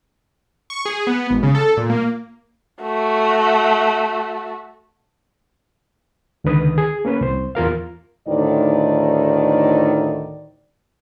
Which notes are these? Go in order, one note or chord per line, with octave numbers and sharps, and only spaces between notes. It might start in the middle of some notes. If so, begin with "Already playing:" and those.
C#6
G#4
B3
G#1
C#3
A4
A#2
A#3
A3 F#4
C#2 D3 D#3 B4 D#6
G#4
A#3 C#4 B4
C2 C5
E2 F4 A#4 F5
D2 A2 D#3 D#4 D5